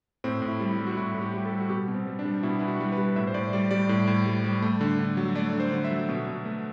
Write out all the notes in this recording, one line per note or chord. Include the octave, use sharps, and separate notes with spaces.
A2 C4
A2
E4
G3
E4
G3
F#4
A2 E4
A2
G4
G3 G4
A4
G3
F#4
B2 G4
B2
C4
G3
D4
G3
B2 E4
B2 E4
F#4
G3
B4
G3
A2 E5
C5
A2 D5
G3 D5
G3 D5
A2
A2
G3
G3
A3
D3
D3
F#3
A3 D5
D3
C5
D3
E5
F#3
B2
B2
A3